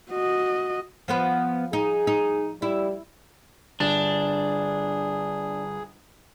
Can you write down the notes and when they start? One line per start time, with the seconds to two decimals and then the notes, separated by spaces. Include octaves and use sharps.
0.11 F#4 D#5
1.08 F3 B3 B4
1.73 D#4 G#4
2.07 D#4
2.62 G3 E4
3.80 G1 D4 G#4 A6 E7